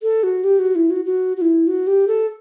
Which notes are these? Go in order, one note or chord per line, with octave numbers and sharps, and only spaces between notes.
A4
F#4
G4
F#4
E4
F#4
F#4
F#4
E4
F#4
G4
A4